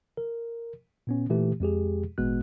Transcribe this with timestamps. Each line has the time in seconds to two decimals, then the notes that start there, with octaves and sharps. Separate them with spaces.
0.17 A#4
1.07 A#2 B3 C#4
1.30 A#2 E3 A3 G4
1.60 F2 G#3 G4 G#4
2.18 G#1 A#2 G#3 B3 F#4 F#6